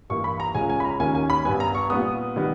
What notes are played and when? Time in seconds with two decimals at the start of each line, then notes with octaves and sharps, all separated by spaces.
0.10 G2 E3 A#3 C#6
0.24 B5
0.40 A#5
0.55 C#2 C#3 G#3 C#4 G#5
0.70 G#5
0.80 B5
0.85 A#5
1.00 D#2 D#3 A#3 C#4 G#5
1.15 G#5
1.30 B5
1.45 G2 G3 B3 G#5
1.60 A#5
1.75 C#6
1.90 A#2 G3 B3 D#6
2.36 D#3 G3 B3